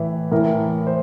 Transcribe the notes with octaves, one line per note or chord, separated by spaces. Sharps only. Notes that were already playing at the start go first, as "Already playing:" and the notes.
Already playing: A2 E3 B4
A2 E3 A#4
C5